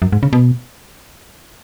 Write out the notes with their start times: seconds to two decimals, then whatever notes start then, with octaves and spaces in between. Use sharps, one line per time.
0.02 F#2
0.12 G#2
0.23 C#3
0.33 B2